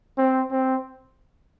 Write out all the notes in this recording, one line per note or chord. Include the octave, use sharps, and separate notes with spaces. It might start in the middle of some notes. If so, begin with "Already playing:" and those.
C4
C4